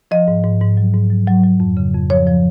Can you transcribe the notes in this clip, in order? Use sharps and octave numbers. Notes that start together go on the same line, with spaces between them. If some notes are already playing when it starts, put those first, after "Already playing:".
F3 D#5
G#2
G#2
G#2
F#3
G#2
F#3
F#3
F#3
F2
C#3
F2
F3 C#5
F3